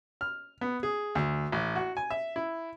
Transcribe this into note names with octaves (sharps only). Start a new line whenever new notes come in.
F6
B3
G#4
D2
A1
F#4
G#5
E5
E4